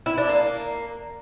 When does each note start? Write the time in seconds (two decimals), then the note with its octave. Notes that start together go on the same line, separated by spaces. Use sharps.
0.06 E4
0.18 D4
0.29 A#3